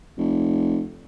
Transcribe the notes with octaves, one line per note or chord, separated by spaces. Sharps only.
F1